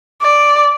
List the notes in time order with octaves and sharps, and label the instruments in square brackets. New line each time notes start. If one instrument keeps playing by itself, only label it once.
[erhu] D5